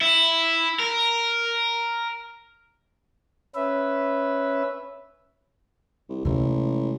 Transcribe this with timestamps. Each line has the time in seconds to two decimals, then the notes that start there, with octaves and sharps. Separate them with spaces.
0.01 E4
0.80 A#4
3.55 C#4 B4 E5
6.09 C2
6.25 A1 C3 G#3